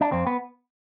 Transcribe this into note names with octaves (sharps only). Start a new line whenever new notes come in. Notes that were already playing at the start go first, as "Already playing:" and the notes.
D4
F2 C4
B3